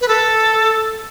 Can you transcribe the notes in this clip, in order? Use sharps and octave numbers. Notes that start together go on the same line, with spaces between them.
B4
A4